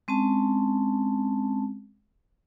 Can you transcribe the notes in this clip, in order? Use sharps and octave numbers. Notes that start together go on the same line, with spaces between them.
G#3 C4 C#4 A5